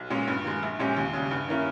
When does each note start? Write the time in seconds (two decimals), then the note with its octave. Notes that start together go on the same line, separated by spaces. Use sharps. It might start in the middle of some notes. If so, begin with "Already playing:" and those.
Already playing: B1
0.10 A#2 G#3 C#4
0.27 G2
0.44 D#3 G#3
0.63 A#1
0.79 A#2 G#3 C#4 G4
0.97 D#2
1.13 C#3 G3
1.31 G2
1.48 D#3 A#3 C#4 E4